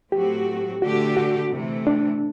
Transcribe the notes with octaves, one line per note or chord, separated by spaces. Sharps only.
A2 F#3 A3 C4 F#4 G4
D3 A3 D4 F#4 G4
F#4
C3 E3 A3
D4